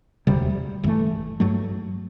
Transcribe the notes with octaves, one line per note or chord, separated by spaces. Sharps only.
E1 D2 C3 G3
G1 G2 E3 A3
G2 F#3 A3